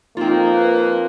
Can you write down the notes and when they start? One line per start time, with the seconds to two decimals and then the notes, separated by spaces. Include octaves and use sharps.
0.17 F2 A#3 C4 D#4 F4
0.54 B4